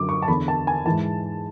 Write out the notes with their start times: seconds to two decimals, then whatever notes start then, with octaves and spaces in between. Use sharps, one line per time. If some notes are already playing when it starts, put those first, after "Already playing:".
Already playing: F#2 D3 D6
0.09 C#6
0.22 A5
0.28 E2 D3 B5
0.48 A5
0.67 G#5
0.86 G#2 E3 A5